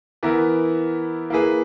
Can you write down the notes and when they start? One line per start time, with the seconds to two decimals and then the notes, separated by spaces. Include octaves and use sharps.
0.23 E3 B3 E4 A#4
1.30 A#3 E4 G#4 B4